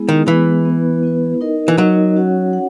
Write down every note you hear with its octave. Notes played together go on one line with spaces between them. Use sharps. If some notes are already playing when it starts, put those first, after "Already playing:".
Already playing: G#3 B3 E4 G#4
D#3
E3 G#3 B3 E4 G#4
B3 E4 B4
B3 E4 B4
D#4 A#4 D#5
E3
F#3 D#4 A#4 D#5
C#4 F#4 C#5 F#5
F#5